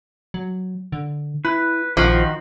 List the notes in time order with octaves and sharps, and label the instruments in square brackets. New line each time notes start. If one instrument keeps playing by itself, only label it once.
[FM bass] F#3
D3
[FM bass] E4 [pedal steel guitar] B4
[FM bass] A#1 [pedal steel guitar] D#3 F#4 [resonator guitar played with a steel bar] F3